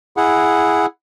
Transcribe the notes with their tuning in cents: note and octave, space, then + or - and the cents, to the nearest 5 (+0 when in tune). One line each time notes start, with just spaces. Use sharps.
E4 +0 G#4 +0 F#5 -5